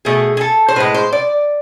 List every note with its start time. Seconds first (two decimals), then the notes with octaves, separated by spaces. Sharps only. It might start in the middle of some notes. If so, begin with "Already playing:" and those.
0.05 B2 A3 G#4
0.37 G#4
0.41 A4
0.68 C5
0.76 A2 G#3 B4
0.94 C5
1.13 D5